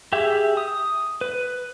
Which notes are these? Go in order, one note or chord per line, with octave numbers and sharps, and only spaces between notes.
G4 G#4 E5
D#6
B4